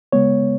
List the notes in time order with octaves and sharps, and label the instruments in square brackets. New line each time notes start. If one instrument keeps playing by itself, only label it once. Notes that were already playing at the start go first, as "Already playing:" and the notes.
[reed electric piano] C#3 G#3 B3 C#5